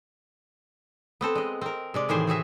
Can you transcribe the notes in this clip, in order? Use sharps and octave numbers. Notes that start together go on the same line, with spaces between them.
B3 C4 A4
G#3 D#5
C4 A#4
C3 G#3 D5
A2 D#3 E3 G#4 C5 G#5
C4 F#4 G#4 E5